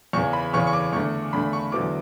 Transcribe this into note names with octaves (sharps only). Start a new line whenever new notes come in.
E2 C#3 E3 C#6
B5
E2 C#3 E3 C#6
C#6
D6
E2 D3 A3 D4 C#6
E2 D3 A3 D4 B5
C#6
E2 D3 F#3 B3 E4 D6